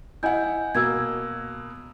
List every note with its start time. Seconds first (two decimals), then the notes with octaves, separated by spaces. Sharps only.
0.23 E4 D#5 F#5 G#5 G6
0.75 B2 A#3 E6 G#6